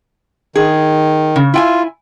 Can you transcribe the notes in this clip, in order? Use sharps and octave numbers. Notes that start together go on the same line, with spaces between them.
D#3 G#4
C#3
E4 F4 G5 G#5